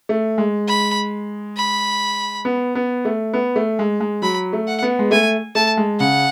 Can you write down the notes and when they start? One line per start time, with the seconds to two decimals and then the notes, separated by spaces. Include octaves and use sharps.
0.09 A3
0.38 G#3
0.68 B5
1.57 B5
2.45 B3
2.75 B3
3.05 A3
3.33 B3
3.56 A3
3.79 G#3
4.00 G#3
4.22 F#3 B5
4.53 A3
4.67 F#5
4.82 B3
4.99 G#3
5.11 A3 G#5
5.55 A3 A5
5.77 G#3
6.00 C#3 F#5